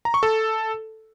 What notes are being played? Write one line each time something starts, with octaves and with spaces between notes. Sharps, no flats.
A#5
C#6
A4